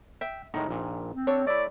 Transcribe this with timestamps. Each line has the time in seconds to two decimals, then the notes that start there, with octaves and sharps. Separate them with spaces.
0.21 E5 G5
0.54 A2 D#3 G#3 D#4
0.69 A#1 A#2
1.13 C4
1.27 D4 A4 C#5
1.47 A3 E4 D5